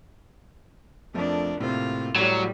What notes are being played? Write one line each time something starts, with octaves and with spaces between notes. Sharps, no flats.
F2 F3 A3 D4 A#4
A2 C3 A#3 C4 F4
A2 F#3 G3 C#5